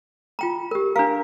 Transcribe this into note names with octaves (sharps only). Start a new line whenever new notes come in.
F4 G5 A#5
G4 A#4
D4 A#4 F5